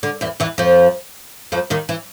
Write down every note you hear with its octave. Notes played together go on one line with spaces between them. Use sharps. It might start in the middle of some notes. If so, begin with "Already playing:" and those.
D3
E2 E3
E2 E3
F2 F3
F2 F3
D#2 D#3
E3